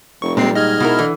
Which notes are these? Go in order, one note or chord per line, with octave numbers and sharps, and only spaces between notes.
F1 C#6
A#2 G3 G#3 C4 C7
G#2 D#5 F6 G#6
B2 E4 A#4
D3 E3